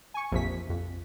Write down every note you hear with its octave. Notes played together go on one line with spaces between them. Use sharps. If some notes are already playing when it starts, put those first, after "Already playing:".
G#5 C#6
A#1 F2 C3 B6
F2